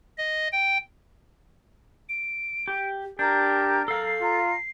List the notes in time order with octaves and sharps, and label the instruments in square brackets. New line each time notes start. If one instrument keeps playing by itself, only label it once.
[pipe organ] D#5
G5
[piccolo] D7
[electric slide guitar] G4
[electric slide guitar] D4 [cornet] G4 [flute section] A#4 A#5 [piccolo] G6
[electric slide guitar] A4 F5 [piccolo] C7
[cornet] F4 [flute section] A#5